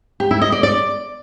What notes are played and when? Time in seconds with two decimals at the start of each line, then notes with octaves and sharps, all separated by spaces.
0.20 G4
0.31 E4
0.42 D#5
0.52 D5
0.63 D5